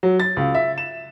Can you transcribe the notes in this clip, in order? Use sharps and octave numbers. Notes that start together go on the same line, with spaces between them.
F#3
A6
C#2
E5
E7